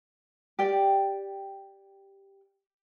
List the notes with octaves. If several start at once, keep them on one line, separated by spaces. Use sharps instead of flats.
G4 D5 G5